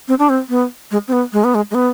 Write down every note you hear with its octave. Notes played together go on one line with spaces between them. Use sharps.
C4
D4
C4
B3
G#3
C4
B3
G#3
B3
G#3
G#3
B3